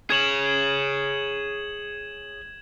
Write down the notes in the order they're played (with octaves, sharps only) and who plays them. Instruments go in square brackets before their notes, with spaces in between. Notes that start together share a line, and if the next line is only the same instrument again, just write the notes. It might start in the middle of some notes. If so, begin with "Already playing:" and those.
[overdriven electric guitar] G#4 C#5 [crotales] G#6 E7 F#7